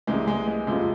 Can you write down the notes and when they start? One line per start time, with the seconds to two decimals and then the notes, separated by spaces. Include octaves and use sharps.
0.07 C2 C3 E3 G#3
0.27 G#3
0.47 G#3
0.67 G1 F2 C3 G#3